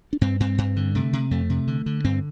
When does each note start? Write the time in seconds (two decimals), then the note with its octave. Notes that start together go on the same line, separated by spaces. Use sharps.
0.13 D4
0.21 G2 C4
0.40 G2 C4
0.58 G2
0.76 D3
0.95 C3 A3
1.13 C3
1.31 F2 A3
1.50 C3
1.67 D3
1.86 D3
2.04 G2 C4